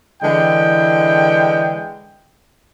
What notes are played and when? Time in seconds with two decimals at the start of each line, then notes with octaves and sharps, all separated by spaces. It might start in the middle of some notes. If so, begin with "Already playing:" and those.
0.22 D3 E3 G#3 E4 G5